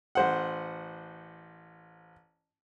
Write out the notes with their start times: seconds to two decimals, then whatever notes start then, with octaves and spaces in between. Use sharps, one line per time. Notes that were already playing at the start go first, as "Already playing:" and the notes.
0.15 A1 C5 F#5